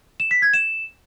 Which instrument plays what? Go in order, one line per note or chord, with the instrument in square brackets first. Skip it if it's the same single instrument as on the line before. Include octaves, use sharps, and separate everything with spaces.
[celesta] E7
B6
G#6
E7